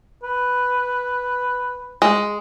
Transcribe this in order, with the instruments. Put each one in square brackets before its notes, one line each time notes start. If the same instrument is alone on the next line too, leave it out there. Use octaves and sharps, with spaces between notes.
[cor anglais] B4
[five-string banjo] G#3